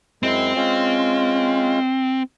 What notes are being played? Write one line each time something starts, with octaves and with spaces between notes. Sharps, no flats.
F#2 G#3 C4 E4
G#3 C#4 F4